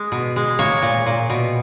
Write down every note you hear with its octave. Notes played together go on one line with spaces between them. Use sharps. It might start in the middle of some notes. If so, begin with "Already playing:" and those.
Already playing: G#3
B2
G#3
A#3 C#5
A#2
A#2
B2